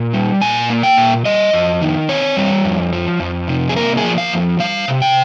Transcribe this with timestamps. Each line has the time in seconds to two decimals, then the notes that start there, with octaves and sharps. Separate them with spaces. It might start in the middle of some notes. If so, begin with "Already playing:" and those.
Already playing: A#2
0.13 G3
0.42 A#2 G#5
0.70 A#3
0.83 G5
0.97 A#2
1.25 G3 D#5
1.53 F2
1.81 D#3
2.09 C4 C#5
2.37 G3
2.64 F2
2.93 F3
3.20 F2
3.48 C3
3.69 G#4
3.76 A#3 A#4
3.97 G#4
4.04 F3
4.18 F5
4.32 F2
4.60 G3 F5
4.88 C3
5.02 G5